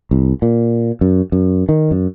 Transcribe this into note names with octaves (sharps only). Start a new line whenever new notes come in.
C2
A#2
F#2
F#2
D#3
F#2